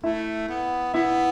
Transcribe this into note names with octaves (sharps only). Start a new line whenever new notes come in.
A3 E4 E5
B3
B3 E4 E5